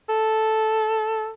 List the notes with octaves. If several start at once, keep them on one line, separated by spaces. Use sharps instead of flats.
A4